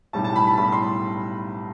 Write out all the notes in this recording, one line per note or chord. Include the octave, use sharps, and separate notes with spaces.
B1 A2 G3 A5
A5
B5
B5
B1 A2 G3 B5
C6